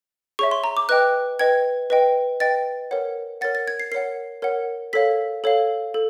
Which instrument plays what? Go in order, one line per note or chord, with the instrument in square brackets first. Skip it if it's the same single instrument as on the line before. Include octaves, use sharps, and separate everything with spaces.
[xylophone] G#4 C#5 E5 C#6
C6
A#5
D6
B4 D#5 G5 F#6
B4 D#5 G5 G#6
B4 D#5 G5
B4 D#5 G5 A6
A#4 C#5 F#5
A#4 C#5 F#5 A6
A6
G#6
C7
A#4 C#5 F#5 C7
A#4 C#5 F#5
A4 C#5 F5 B6
A4 C#5 F5
A4